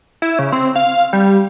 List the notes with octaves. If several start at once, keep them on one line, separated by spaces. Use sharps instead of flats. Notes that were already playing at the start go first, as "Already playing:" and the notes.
E4
C#3
C4
F5
G3